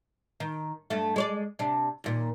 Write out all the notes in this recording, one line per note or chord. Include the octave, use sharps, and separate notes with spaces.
D#3
G2 A3
G#3 C#5 D5
C3 D4
D#2 A#2